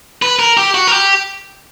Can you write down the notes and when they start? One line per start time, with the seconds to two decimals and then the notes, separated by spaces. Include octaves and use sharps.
0.22 B4
0.39 A#4
0.57 G4
0.74 F#4
0.87 A#4
0.92 G4